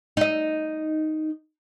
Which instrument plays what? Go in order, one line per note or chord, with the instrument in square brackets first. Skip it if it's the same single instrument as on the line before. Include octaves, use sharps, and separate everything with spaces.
[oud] D#4 D#5